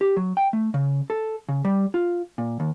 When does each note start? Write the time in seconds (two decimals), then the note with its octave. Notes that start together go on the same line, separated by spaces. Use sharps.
0.01 G4
0.17 F#3
0.37 G5
0.53 A3
0.74 C#3
1.10 A4
1.49 C#3
1.65 G3
1.94 F4
2.38 A#2
2.60 D#2